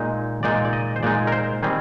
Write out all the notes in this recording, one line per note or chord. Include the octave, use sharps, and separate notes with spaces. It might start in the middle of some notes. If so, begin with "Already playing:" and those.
Already playing: A#2 G#3 D#4
A#2 G#3 D#4 D5
D5
D#5
C5
A#2 G#3 D#4 D5
A#4
C5
D#3 G3 C4 G#4